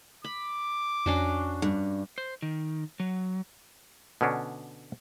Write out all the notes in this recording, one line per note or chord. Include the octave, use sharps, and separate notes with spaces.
B5 D6
F2 C#4 D4 F#4 C7
G2
C5
D#3
F#3
B2 D3 C#4 D4